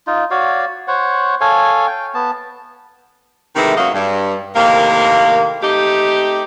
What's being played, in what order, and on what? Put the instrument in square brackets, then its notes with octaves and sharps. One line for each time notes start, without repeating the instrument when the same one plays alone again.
[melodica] D#4 F4
F#4 C#5 D5 F5
C5 C#5 F#5
A4 C#5 F5 G#5
G5
B3 A5
[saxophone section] C3 D#3 E3 G#3 A3 E4
F#2 F#3 A#3 C#4 F#4 D#5
G2
A2 C3 D#3 A#3
A3 C4 D#4 G4